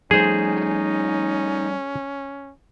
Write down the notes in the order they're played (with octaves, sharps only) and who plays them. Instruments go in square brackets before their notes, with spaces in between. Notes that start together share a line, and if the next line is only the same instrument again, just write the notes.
[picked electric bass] F3 G3 A3 [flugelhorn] C#4 [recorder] D#4 [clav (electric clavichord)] G#4 C5